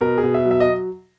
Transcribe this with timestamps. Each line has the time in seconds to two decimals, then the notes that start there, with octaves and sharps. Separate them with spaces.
0.01 B2 A#4
0.18 G#4
0.23 B2
0.34 E5
0.45 F#3
0.51 E5
0.60 D#5